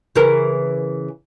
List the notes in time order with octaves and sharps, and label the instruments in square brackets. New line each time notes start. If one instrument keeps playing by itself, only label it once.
[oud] C#3 E3 A#4